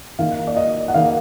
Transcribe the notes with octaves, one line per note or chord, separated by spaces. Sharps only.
D#3 A#3 F5
D5
D#5
F#5
D#3 A#3 F5